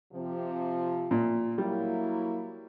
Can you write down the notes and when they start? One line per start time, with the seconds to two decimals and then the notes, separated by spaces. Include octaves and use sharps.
0.13 C3 F3
1.11 A#2
1.58 F#3 G3 A#3 E4